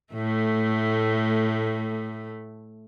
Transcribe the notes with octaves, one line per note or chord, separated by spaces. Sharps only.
A2 A3